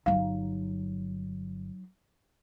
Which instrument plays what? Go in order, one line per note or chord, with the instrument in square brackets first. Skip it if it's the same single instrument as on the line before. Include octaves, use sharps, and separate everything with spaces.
[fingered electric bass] G1 [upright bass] F#3 D#4 [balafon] F5